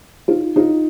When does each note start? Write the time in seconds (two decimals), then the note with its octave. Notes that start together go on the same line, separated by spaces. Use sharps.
0.28 D#4 F4
0.56 D#4 F4